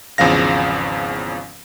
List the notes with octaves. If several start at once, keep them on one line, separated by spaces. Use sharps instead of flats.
G#1 E2 C#3 F3 F5 A#6